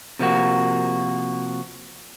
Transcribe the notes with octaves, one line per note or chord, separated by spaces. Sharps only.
C3 F3 A#3 F#4